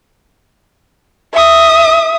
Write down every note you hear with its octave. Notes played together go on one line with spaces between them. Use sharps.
E5 D#6